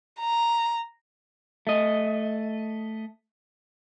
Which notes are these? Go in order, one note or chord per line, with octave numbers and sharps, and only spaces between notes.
A#5
A3 D#5